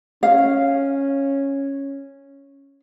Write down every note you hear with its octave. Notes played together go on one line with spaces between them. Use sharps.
C#4 F5